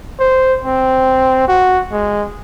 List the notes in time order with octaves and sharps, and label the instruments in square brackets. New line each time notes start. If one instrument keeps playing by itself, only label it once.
[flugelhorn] C5
C4
F#4
G#3